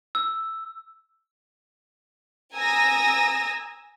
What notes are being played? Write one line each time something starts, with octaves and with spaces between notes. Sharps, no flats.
E6
G#5 A#5 D#6 E6 A#6